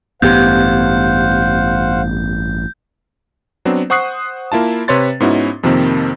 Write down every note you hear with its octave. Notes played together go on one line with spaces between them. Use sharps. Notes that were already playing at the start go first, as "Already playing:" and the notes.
A1 G2 B3 G4 C5 F5 F#5 G6
F#3 B3 C4 D4
C5 F#5 C#6 D#6 F#6 C7
A#3 E4 F4 A5
C3 B4 C#5 C6 A6
G#2 B3 C#4 D#4 E4 F#4
F2 C3 D#3 F3 A#3 C4